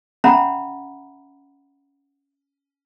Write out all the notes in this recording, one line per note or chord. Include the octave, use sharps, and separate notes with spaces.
C#4 E5 F#5 A#5 B5